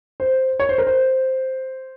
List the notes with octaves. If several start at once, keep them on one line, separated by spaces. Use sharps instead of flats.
C5
C#5
C5
A#4
C5